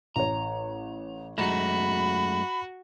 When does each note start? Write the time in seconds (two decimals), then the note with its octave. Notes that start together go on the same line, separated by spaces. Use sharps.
0.16 A1 C#5 A#5
1.38 F#2 G#3 A3 F#4 A#5 B5 A#6 E7